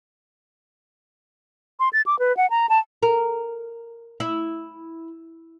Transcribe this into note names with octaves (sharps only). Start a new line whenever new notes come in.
C6
A6
D6
B4
F#5
A#5
A5
A#4
E4